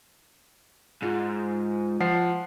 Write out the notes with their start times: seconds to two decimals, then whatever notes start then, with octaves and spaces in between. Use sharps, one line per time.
1.03 G#2 F4
2.00 F3 F#5 C7